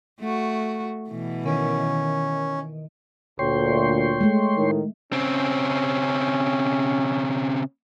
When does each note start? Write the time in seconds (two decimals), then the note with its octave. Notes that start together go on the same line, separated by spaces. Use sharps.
0.20 A3 F#4
1.10 B2 E3
1.46 D#3 C#4
3.39 D2 A#2 C#5 G5 C6
4.21 G#3 A3
4.57 A2 D#3
5.13 C#3 C4 C#4